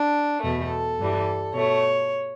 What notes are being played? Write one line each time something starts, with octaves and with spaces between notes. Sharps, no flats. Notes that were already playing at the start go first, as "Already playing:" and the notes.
Already playing: D4
E2 B2 A3 A4
G2 E3 G3
B2 A3 C#5